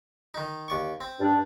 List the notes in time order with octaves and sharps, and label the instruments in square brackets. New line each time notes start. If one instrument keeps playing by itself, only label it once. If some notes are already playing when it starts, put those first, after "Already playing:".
[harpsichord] D#3 D#4
D#2 D5 C#6
C4
[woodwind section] G2 D4